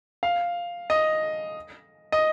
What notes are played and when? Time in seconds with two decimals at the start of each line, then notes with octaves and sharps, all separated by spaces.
0.23 F5
0.90 D#5
2.12 D#5